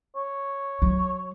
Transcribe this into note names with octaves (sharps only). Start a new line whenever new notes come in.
C#5
F#3